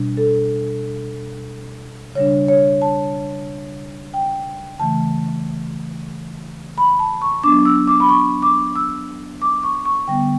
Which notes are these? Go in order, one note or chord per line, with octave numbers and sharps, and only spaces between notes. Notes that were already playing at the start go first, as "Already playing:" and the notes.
Already playing: B2 G3 D4
A4
C#3 G3 D4 C#5
C#5
A5
G5
C#3 E3 A3 A5
B5
A5
C#6
F#3 B3 D4 D6
E6
D6
B5
C#6
D6
E6
D6
C#6
C#6
D3 G3 B3 G5